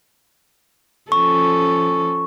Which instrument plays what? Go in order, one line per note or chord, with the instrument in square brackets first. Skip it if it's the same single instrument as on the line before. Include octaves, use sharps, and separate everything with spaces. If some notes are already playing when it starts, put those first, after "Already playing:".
[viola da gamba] F3 C#4 A4 [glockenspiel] C#6